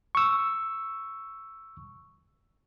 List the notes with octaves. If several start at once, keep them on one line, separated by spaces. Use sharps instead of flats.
C#6 E6